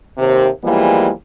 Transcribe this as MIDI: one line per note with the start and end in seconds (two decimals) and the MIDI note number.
0.18 0.47 39
0.18 0.47 48
0.64 1.10 40
0.64 1.10 52
0.64 1.10 53
0.64 1.10 55
0.64 1.10 56
0.64 1.10 58